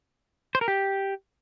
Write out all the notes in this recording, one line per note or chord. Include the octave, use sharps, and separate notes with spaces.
C5
A#4
G4